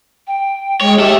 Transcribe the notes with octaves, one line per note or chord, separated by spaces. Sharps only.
G5
G#3 C#5
G4 A4 E5